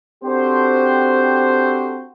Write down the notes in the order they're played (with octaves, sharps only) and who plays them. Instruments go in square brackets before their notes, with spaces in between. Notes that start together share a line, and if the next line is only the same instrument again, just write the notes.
[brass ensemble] C4 D4 F#4 G4 A4 C5